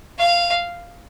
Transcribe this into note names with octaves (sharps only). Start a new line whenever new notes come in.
F5